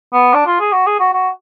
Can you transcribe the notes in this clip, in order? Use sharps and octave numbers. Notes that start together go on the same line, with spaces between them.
B3
D4
F4
G#4
F#4
G#4
F#4
F#4